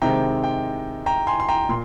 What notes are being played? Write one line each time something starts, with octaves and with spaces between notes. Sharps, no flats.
C3 D#3 G#3 C4 G5 A#5
G5
G5 A#5
G#5 C6
C6
G5 A#5
A#2 C6